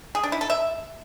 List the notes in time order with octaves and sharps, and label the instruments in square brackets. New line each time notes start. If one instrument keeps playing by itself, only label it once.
[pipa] G#4
D4
E4
A4
E5